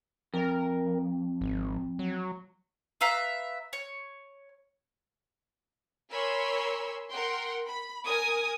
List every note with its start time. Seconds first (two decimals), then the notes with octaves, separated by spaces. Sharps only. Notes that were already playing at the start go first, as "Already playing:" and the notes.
0.34 F2 A#4
1.41 G#1
1.99 F#3
3.01 B4 E5 F5 A#5
3.73 C#5
6.11 A#4 C#5 G#5 B5 C6 E6
7.11 A#4 F#5 G5 C6
7.66 B5
8.07 A#4 G#5 D#6 G#6